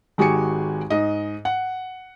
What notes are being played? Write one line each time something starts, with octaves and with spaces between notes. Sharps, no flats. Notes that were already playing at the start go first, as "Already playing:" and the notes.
G#1 G#3 F#4 G4 G#5 C#7
G#2 D#5
F#5